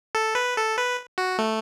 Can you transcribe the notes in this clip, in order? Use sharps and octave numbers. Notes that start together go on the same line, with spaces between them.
A4
B4
A4
B4
F#4
A3